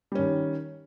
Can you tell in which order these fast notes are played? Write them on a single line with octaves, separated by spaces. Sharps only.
G3 C#4 D#3